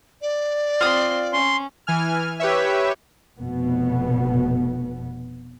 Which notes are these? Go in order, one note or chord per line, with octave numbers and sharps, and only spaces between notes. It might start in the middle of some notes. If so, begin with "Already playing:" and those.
D5
C4 F4 C6 D#6
C#4 C6
E3 G#5 F6
G4 B4 C#5 E5
F1 B2 B3